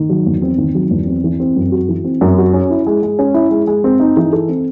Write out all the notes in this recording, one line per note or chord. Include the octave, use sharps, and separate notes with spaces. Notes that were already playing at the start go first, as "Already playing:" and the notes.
Already playing: D#3
F#3
E2
C4
D#3
F#3
E2
C4
E3
C4
F#2
F#4
E3
C4
F#2
F#4
C#4
E4
G#3
G#3
C#4
E4
G#3
G#3
C4
D#4
E3
A4
C4